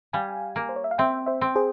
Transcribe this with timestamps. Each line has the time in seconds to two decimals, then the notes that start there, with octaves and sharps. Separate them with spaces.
0.13 G3 F5 G#5
0.56 A#3
0.69 C5
0.76 C#5
0.84 E5
0.91 F5
0.98 C4 E5 G5
1.26 C5 E5
1.41 C4
1.56 G#4 C5